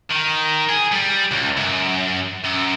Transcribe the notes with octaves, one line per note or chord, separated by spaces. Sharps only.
D#3
G#4
G3
C#2
F#2
F#2